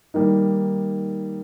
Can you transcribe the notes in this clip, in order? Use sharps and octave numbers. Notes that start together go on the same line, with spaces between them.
D#3 G3 A#3 D#4